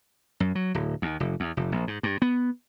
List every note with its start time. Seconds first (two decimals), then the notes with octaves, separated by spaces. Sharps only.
0.40 F#2
0.55 F#3
0.75 D1
1.02 D#2
1.20 F1
1.40 E2
1.57 F1
1.72 A#1
1.87 G#2
2.03 G2
2.22 B3